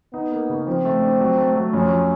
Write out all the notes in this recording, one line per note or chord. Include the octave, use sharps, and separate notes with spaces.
B3 D#4
A#3
C#3
F3 C4
A3
D4
F#3
A3
F#3
F2 C#4
F3